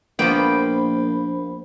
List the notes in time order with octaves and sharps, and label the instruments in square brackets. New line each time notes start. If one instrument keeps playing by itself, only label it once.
[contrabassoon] A#1 [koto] F3 A#3 B3 [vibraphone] C5 B5 [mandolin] G5